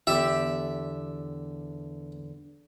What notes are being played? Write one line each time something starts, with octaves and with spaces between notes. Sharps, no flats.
E2 D3 G4 E5